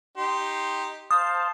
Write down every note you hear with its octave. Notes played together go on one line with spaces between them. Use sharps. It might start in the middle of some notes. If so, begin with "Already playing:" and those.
D#4 G4 C6
C5 F5 A5 D#6